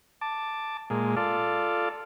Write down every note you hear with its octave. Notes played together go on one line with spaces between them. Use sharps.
A5 D6
A#2 G#3
F4 A4 D5